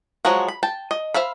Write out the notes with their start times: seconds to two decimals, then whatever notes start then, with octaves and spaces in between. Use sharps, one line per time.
0.25 F3 F#3 G#3 F#4
0.48 B5
0.63 G5 A5
0.91 D#5
1.14 C5 E5 F5 B5